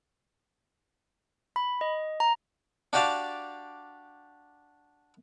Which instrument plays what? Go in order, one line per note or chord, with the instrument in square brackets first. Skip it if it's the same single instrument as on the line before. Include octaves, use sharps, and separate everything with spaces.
[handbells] B5
D#5
A#5
[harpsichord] D4 F#4 G4 D5 F5 A5